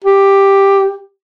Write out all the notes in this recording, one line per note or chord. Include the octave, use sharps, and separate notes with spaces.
G4